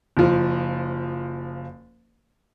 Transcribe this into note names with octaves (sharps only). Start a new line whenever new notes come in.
F#1 F3